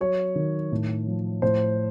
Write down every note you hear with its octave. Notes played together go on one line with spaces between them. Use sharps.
F#3 C#5
D#3
A2
F3
A2 C5